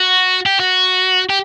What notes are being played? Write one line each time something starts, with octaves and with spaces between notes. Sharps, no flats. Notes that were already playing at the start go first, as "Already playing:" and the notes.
Already playing: F#4
G4
F#4
G4